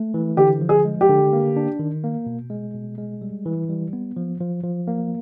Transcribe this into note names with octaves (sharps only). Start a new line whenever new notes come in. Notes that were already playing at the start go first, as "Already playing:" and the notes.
Already playing: A3
E3
D3 G4
F3
G#4
G#3
G4
D3
A#3
D4
D#3
A#3
B2
G#3
B2
G#3
G3
E3
G3
B3
F3
F3
F3
A#3